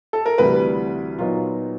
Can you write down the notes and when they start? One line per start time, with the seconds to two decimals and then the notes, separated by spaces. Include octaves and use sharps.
0.13 A4
0.26 A#4
0.38 D2 C3 E3 G3 B4
1.18 A#2 F#3 B3 D#4 F4